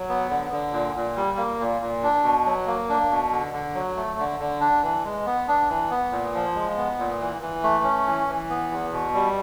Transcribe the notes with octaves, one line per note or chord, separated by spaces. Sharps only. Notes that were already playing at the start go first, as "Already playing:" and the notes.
Already playing: F#3
B3
D3
D3
A#2
A#2
G3
A#3
A#2
A#2
D4
B2
F#3
A#3
D4
B2
D3
D3
F#3
A3
D3
D3
D4
E3
G#3
B3
D4
E3
B3
A#2
F3
G#3
B3
A#2
E3
E3
A3
C#4
E3
E3
B3
E2
B2
G3